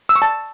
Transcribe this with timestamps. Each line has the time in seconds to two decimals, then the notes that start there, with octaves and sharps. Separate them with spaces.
0.09 E6
0.16 C#6
0.22 A5